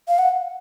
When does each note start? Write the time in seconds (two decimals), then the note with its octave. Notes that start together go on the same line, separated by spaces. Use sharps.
0.08 F5
0.19 F#5